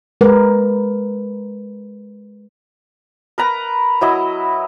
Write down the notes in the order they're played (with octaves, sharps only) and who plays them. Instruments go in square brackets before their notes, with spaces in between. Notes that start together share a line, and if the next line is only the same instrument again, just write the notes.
[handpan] G#3 A#4 B4
[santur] A#4 B4 A#5
F#3 E4 D#5